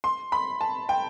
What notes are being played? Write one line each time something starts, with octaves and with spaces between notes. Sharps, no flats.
C6
B5
A5
G5